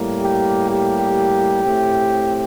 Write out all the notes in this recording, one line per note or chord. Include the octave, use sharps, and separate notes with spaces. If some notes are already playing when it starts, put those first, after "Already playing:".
Already playing: A2 G3 A#3
G4
G4
A2 A3 C4